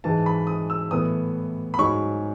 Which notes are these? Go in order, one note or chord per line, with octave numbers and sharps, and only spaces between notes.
G#2 E3 G#3 A5
B5
D#6
E6
A2 E3 B3 D#6
B5
G#2 F#3 C#4 C#6